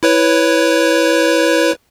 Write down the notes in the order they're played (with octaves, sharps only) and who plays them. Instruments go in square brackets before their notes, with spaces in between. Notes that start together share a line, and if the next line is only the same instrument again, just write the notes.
[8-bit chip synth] E4 B4 C#5